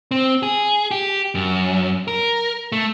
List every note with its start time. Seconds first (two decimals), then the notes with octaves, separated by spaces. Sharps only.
0.11 C4
0.43 G#4
0.91 G4
1.35 F#2
2.08 A#4
2.72 A3